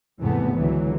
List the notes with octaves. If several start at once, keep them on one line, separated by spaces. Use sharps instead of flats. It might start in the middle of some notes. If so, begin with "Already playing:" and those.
G#1 E2 C3 E3 A3 B3
C#2 D3 E3 F#3